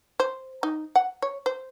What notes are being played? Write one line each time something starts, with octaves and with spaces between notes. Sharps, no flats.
C5
D#4
F#5
C#5
C5